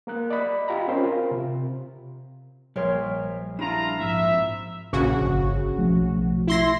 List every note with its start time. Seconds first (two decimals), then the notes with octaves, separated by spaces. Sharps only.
0.07 A#3 A#4 F#6
0.30 D5 D#5 B5
0.68 F4 G4 A#5 B5
0.88 C4 C#4 A#4 C5
1.03 F4 A#4
1.31 C3
2.76 A#1 G3 A#4 C5 C#5 F6
3.59 D4 E4 F4 G4 A5 A#5
3.99 G#2 F3 C4 E5
4.93 A#1 C#3 F#4
5.21 G1
5.78 B1 F3 A3
6.47 E4 C6 A#6